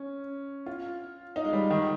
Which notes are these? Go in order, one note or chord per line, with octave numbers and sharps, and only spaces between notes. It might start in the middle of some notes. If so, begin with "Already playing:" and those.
Already playing: C#4
F4
D#4
G#3
G3
D#3